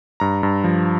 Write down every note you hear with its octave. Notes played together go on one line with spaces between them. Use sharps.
G2 A#5
G2
F3